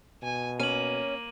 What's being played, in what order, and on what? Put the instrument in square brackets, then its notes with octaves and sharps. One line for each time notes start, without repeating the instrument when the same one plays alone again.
[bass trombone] B2 [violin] G#5
[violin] A#3 [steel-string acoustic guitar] C#4 [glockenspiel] D#7 F#7